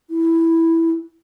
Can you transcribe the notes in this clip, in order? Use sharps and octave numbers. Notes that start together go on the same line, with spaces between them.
E4